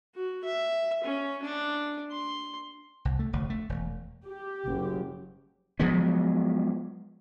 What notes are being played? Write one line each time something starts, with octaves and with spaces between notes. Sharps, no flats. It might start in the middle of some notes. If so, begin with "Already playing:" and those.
F#4
E5
C#4
D4
C6
C2
A3
F1 D2
A3
E1
G4
F#1
F3 F#3 G#3 B3